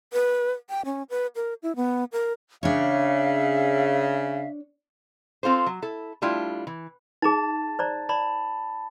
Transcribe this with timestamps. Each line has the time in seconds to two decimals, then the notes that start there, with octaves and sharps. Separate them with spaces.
0.13 B4
0.70 G5
0.85 C#4
1.10 B4
1.36 A#4
1.63 E4
1.76 B3
2.12 A#4
2.63 C#3 D4 C#5 E5 F5
5.43 C4 F4 A4 C5
5.66 F#3
5.82 E4 A4
6.22 G3 A3 D4 E4 F4
6.67 E3
7.22 D#4 G#4 A5 A6
7.79 C5 D5 A#5
8.09 D5 A5 B5